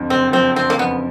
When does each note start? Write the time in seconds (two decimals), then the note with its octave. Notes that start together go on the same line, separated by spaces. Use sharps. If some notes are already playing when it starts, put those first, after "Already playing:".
Already playing: F2 D3
0.10 F#1 C4
0.32 F3 C4
0.56 D3 C4
0.70 A#3
0.79 F2 B3